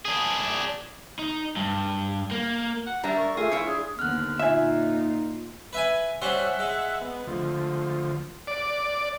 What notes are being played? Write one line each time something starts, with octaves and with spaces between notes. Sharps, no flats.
D4 G#4
D#4
G2
A#3
F#5
G3 D4 D5 E5 A#5
A#4 C#6
A3 F4 G#4 E5
F3 E4 C#5 E5 F5
D4 G#4
D#2 D3 B3 F6 F#6
A#2 D#4 F4 E5 G#5
B4 E5 G#5
G3 C#4 C5 E5 F#5
G#3
B3
D2 F3
D5